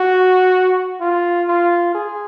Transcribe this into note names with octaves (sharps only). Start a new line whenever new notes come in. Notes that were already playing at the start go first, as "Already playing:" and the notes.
Already playing: F#4
F4
F4
G#4